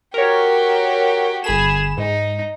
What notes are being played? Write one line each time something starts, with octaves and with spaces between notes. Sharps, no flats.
F#4 G4 A#4 C#5
G1 G#4 B5 E7
G#2 D#4